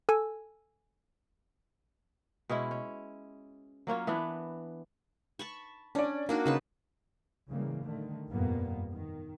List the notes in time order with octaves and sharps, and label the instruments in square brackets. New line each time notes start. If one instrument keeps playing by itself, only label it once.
[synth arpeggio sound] A4 G#5 E6
[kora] B2 G#3 C#4 E4
C#4
F#3 A#3 C#4 F4
E3 B3 D4
[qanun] A5 B5 C#6
[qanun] C#4 [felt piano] D4 D5
[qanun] A#3 D4 F#4 [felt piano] D#4
[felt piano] C#3 [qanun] D#4 B4 A5
[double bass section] A2 C#3 E3 G3 G#3 A#3
D3 D#3 A3
G1 F2 A#2 G3 A#3 B3
D#3